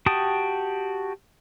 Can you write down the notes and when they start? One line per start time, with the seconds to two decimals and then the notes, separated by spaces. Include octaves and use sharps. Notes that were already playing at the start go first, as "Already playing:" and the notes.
0.06 F#4 G4 G5 A5 D#6